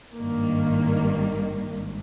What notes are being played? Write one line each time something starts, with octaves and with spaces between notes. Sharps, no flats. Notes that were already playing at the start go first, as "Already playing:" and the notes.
G#1 G2 D#3 A#3
G#1